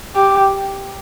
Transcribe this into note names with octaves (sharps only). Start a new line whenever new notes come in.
G4